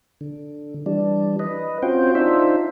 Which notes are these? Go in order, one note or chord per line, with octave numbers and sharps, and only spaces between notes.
D3
E3 G3 D4
B4 D#5
C4 C#4 F4 F#4 C5 G5
D4 D#4 F4 C5 E5